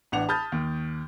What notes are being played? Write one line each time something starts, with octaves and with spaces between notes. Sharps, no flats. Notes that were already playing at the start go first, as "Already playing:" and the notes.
A1 D4 F#5 F7
A5 B5 D#6 F6 G6 A6
D#2